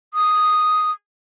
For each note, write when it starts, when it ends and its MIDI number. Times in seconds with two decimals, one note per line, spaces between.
0.14 0.91 87